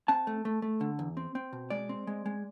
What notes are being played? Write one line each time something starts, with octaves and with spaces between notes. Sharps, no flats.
C4 A5
A3
A3
A3
D3
E2
C4
C4
B2
G#3 D5
C4
G#3
G#3